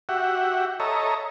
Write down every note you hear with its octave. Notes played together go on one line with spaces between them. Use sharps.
F#4 G4 E5 F#5
A4 C#5 D#5 E5 A#5